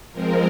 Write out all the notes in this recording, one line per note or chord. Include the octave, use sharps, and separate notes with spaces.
F3 G#3 C4 A#4